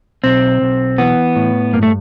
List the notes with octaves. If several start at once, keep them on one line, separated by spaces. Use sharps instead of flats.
B1 C4
B1
E3 B3
A2
G2 A#3
A3